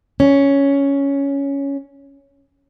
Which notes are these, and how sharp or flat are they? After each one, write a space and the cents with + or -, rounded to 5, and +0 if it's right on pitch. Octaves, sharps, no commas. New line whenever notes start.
C#4 +5